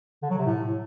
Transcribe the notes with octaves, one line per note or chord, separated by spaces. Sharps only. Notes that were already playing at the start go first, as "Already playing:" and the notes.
D3
F#3
C3
A2